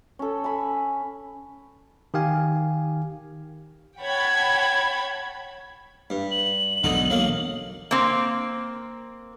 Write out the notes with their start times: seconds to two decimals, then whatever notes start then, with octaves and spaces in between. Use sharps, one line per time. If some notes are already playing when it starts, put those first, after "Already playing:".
0.19 C#4 A4
0.44 G#5 B5
2.14 D#3 G4 F5 G#5
4.01 C#5 F#5 G5 A5 B5 G#6
6.10 G2
6.31 F#7
6.84 E1 B1 D3 D#4
7.10 F#3 A#3
7.91 A#3 C4